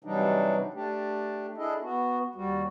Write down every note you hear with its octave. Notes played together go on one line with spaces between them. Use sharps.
C3 E3 F#3 G3 D4 D#4
A3 D4 G4
D4 E4 G#4 A4 D#5
B3 F#4
D#2 G3 F#4